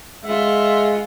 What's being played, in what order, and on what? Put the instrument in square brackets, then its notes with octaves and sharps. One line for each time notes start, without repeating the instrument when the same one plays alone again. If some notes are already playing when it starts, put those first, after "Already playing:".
[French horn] G#3 [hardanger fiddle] F4 F#5 [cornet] E5